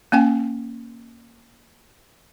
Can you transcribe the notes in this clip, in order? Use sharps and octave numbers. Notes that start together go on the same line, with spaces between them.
A#3 C#4 G5 G#5